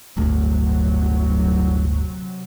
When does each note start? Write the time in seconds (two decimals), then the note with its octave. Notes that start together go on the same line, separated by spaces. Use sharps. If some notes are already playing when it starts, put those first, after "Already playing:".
0.17 D1 G1 D2 C3 F#3